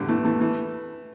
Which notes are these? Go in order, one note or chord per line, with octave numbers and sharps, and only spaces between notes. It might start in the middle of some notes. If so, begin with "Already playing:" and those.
Already playing: E2 A2 D3 G3
E3 A3
E3 A3
E3 A3